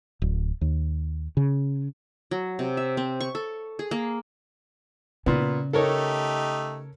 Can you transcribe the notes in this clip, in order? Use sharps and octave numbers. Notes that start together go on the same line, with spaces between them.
D1
D#2
C#3
F#3
C3
E5
C4
C#6
A4
G#4
A#3
A#2 C#3 B3
A3 D#4 G4 A4 A#4 C#5